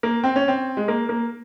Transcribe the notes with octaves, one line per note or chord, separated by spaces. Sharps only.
A#3
C4
C#4
C4
G#3
A#3
A#3